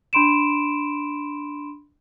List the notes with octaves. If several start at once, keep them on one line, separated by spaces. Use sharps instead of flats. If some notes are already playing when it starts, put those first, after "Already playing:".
D4 B5 C6 D7 E7